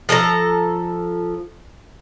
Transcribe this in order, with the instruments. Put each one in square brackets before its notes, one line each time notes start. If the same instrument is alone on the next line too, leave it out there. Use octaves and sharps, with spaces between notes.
[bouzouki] F3 A4 C#5 A#5